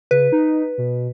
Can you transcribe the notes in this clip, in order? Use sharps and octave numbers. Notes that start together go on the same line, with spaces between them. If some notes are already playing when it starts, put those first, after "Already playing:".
C#3 B4
D#4
B2